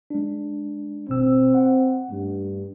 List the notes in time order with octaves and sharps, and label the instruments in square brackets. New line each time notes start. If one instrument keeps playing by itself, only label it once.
[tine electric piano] G#3 D4
[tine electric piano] G#1 B2 E6 [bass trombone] C4
[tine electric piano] F#5
[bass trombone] G2 [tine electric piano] A3